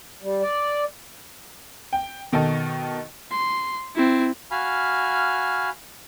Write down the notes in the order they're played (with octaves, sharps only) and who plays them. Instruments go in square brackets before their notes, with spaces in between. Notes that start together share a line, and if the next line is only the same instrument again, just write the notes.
[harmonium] G3
D5
[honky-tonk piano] G5
B2 D#3 D#4 A4
[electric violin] C6
C4 E4
[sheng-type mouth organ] F#4 F5 G#5 B5 F6